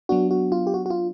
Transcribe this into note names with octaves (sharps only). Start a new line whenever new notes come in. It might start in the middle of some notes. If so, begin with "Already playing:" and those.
F#3 B3 D4 F#4
F#4
F4
G4
F#4
F#4
F4